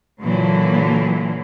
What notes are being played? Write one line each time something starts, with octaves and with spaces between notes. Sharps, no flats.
A#2 D3 E3 F#3